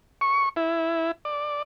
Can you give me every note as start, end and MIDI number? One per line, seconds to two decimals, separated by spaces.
0.21 0.49 85
0.56 1.11 64
1.25 1.62 74